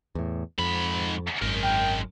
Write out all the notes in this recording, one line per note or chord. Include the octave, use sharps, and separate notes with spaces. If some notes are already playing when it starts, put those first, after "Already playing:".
E2 A2
F2 G#2 B5
G#1 F#2 G#3 A#4
G5